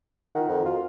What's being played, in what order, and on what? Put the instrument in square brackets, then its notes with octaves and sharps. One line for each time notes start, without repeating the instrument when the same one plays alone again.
[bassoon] D#3 [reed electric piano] F4 A#4 F#5
[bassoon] F2
[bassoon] F4 [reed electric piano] F#4